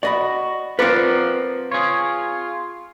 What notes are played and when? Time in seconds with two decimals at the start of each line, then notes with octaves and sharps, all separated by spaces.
0.03 F#4 D5 D#5 B5
0.79 F3 C4 A#4 B4 D5 F#5
1.72 F4 G#4 C#5